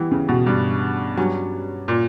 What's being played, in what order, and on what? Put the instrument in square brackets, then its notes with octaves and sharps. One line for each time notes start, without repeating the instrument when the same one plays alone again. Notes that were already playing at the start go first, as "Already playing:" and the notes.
Already playing: [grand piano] E3 [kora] G3 B3 E4
[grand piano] C#3
B2
G2
[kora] G2 F#3 C#4
[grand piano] A#2